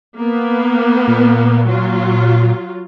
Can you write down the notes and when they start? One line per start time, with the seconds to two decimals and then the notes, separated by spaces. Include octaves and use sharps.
0.18 A#3 B3
1.08 A#2
1.68 F#3 F4